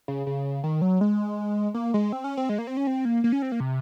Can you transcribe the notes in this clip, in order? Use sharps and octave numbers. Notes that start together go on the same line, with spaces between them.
C#3
C#3
D#3
F#3
G#3
A#3
G#3
C4
C#4
C4
G#3
A#3
C4
C#4
C4
A#3
A#3
C#4
C4
A#3
C3